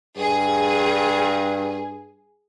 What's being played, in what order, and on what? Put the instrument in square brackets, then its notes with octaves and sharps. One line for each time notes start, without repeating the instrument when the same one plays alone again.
[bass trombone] G2 [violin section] G#4